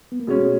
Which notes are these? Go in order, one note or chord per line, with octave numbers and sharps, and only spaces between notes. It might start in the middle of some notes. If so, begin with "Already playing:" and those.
B3
A#3
B2 G#3 A3 C#4